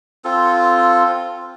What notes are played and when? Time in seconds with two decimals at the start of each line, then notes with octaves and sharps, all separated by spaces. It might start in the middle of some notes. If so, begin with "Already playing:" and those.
0.24 C4 F4 A4